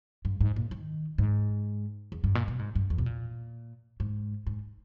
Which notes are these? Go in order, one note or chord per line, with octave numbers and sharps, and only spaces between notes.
G2
G#2
A#2
D#3
G#2
E2
G2
A#2
B2
G#2
G2
E2
B2
A#2
G#2
G#2